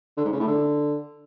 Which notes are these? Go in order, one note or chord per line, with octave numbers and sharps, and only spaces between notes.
D3
G#2
C#3
A2
D3